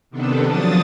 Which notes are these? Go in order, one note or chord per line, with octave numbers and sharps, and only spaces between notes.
C3 D#3 B3 D4 A4
F3 F#3 D4 D#6 A6